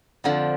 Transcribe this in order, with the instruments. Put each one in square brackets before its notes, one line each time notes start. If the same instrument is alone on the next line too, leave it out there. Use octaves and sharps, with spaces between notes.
[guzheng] F2 D3 F3